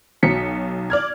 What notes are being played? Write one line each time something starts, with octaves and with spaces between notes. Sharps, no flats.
B1 F#3 B6 C#7
D5 F6 G#6